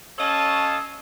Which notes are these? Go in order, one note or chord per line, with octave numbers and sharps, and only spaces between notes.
C#4 A4 C#5 D#5 F5 A5